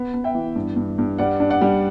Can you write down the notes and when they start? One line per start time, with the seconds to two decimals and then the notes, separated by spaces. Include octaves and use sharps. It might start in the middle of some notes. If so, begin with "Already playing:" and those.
Already playing: B3
0.14 B3
0.24 E5 G5
0.35 E3
0.56 G2
0.76 G2
0.98 G2
1.18 G3 D5 F#5
1.40 D4
1.50 D5 F#5
1.61 G3